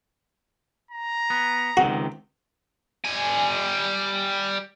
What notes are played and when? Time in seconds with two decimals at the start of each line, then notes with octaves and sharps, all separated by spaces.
0.91 A#5
1.30 B3
1.77 C#2 C3 D#3 F#4
3.05 G3 G#5